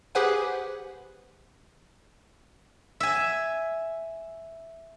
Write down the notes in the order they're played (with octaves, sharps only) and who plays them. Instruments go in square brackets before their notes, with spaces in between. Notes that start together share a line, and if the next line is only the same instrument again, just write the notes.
[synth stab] G4 G#4 B4 C5 F#5 G#5
[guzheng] E5 G#5